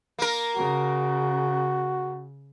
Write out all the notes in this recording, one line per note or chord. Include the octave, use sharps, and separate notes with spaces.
A#3 A#4
C#3 F#4